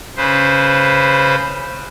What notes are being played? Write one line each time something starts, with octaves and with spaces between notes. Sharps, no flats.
C#3 B4 C5